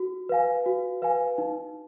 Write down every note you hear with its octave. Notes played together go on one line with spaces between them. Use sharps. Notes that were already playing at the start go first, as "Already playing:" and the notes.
Already playing: F#4
B4 F5 G#5
F#4
B4 F5 G#5
D#4